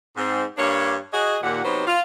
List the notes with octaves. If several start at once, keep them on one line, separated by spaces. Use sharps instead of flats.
G#2 C4
G2 A#3 D4 C#5
F#4 G#4 D#5
D#2 A#2 F#5
C3 F#3 G3 B3 D#4 C5
F4